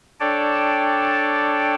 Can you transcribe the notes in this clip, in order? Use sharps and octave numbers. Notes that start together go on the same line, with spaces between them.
D4 A4 C#5 D5 G5 A5